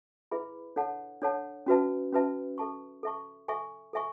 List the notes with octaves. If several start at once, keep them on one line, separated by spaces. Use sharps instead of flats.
E4 G#4 B4 E5 B5
D4 A4 C#5 F#5 A5
D4 A4 C#5 F#5 A5
C#4 F#4 B4 E5 A5
C#4 F#4 B4 E5 A5
A4 E5 A5 C#6
A4 E5 A5 C#6
A4 E5 G#5 C#6
A4 E5 G#5 C#6